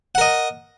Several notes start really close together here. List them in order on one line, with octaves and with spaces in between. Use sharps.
F#5 A#4 D#5